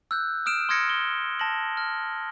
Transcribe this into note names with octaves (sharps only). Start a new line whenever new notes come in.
E6 F#6 G6
D#6 F6 D7 E7
C6 D#6 F6 G#6 A#6 C#7
G7
A5 A#6 F#7
F6